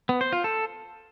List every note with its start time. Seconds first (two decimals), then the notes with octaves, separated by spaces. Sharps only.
0.09 B3
0.21 C5
0.33 F4
0.44 A4